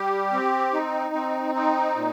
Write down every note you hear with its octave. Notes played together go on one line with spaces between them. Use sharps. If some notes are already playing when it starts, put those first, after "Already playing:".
Already playing: G3 G4
C4
D#4
C4
D#4
A#2